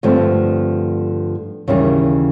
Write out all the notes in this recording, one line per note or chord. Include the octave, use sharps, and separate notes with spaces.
G2 D3 F3 A3 C4
D#2 C#3 E3 G3